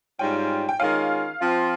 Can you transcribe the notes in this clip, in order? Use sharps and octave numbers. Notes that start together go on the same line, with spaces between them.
G#2 G3 C#4 F4 G5
G5
D#3 G#3 C#4 F4 F5
F3 C4 F4